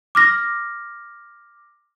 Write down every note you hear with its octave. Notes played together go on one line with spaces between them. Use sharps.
D6 F6 A#6